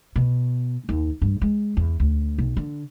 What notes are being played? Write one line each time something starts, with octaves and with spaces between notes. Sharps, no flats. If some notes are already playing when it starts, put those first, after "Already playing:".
B2
D#2
G2
G#3
E2
D2
B1
D3